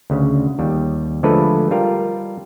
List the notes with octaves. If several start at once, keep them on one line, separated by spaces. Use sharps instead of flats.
D2 C#3
D#2 G3
D3 F3 G#3 A3 A4 B4
G3 F4 A#4